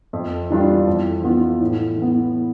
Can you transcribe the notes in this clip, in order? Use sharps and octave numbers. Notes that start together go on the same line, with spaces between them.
F2
E3 G3 D4 F4
F2
E3 B3 F4
A2
E3 B3